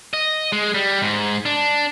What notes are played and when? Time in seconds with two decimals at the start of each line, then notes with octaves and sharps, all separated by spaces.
0.13 D#5
0.52 G#3
0.74 G3
1.02 G#2
1.46 D4